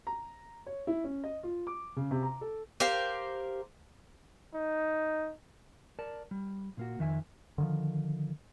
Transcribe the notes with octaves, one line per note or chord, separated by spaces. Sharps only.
A#5
C#5
E4
C#4
D#5
F4
D6
C#3
C3
A#5
A4
G4 A#4 C5 F5
D#4
A#4 D5 A5
G3
A#2 A#3 F#4
F2 D#3 E5 G#5
D3 D#3 F3